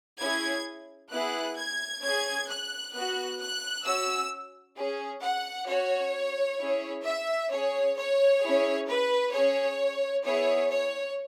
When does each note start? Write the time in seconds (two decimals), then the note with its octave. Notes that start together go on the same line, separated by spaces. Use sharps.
0.20 C#4 E4 G#4 G#6
1.11 B3 E4 G#4 F#6
1.57 G#6
2.02 C#4 G#4 G#6
2.49 F#6
2.94 B3 F#4 F#6
3.40 F#6
3.85 C#4 F#4 E6
4.76 C#4 G#4
5.22 F#5
5.67 C#4 F#4 C#5
6.59 C#4 E4 G#4
7.04 E5
7.50 C#4 G#4 C#5
7.97 C#5
8.42 C#4 E4 G#4
8.88 B4
9.32 C#4 G#4 C#5
10.24 B3 E4 G#4 C#5
10.70 C#5